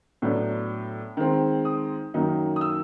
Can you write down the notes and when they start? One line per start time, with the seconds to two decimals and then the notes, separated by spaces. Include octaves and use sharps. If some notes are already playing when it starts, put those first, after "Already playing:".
0.22 A2 F#3 B3 D4
1.17 D#3 G#3 C4
1.65 D#6
2.14 F#2 D#3 F#3 A#3 D#4
2.56 D#6
2.61 E6